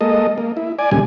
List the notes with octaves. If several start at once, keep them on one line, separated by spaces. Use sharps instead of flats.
G#3 A#3 A4 D#5
A#3
E4
D5 G#5
D2 A#2 C#3 G3 G#3 G#5